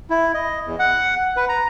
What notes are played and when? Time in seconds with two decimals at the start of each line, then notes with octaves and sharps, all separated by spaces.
0.10 E4
0.34 D#5
0.66 E2
0.79 F#5
1.37 B4
1.49 A#5